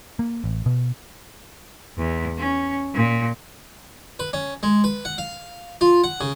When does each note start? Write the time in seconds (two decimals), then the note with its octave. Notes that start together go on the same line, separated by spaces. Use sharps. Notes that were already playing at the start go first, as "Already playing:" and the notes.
0.19 A#3
0.44 A1
0.66 B2
1.98 E2
2.38 C#4
2.94 A#2
4.19 B4
4.33 C#4
4.63 G#3
4.84 B4
5.05 F#5
5.18 F5
5.81 F4
6.04 F#5
6.21 C#3